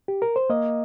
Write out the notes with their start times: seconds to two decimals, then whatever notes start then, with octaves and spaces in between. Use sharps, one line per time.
0.08 G4
0.22 A#4
0.36 C5
0.49 A#3 D#5